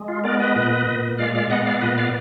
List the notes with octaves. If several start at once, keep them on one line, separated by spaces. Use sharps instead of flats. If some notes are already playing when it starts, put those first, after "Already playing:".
Already playing: G#3
F4
B3 A#4 D5
B4 D#5
A#2
A#2
G#3 D5 F5
D5 F5
B3 D#5 F#5
D5 F5
A#2 B4 D#5
D5 F5